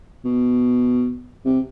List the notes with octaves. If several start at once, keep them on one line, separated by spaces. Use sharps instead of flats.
B2
C3